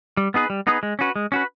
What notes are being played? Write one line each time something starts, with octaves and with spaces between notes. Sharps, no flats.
G3
B3 D#4 G#4 B4
G3
B3 D#4 G#4 B4
G#3
C#4 F#4 B4
G#3
C#4 F#4 B4